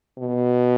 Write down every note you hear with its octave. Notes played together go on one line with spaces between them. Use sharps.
B2